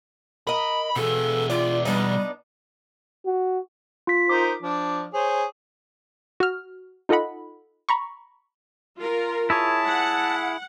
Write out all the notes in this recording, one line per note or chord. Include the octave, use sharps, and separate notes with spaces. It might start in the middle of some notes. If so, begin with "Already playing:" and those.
A#4 D#5 B5
B2 B3 G#4 A4
F4 D5
G3 B3 D4 D#4
F#4
F4 B6
D#4 A#4 C5 D6
F3 D4
G#4 C5 C#5
F#4 F6
D#4 F4 A4 D#5 F#5 B5
A#5 B5 C#6
F4 A#4
E4 G#4 C#5 A5
F#5